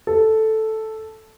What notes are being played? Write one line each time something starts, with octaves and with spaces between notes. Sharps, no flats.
A4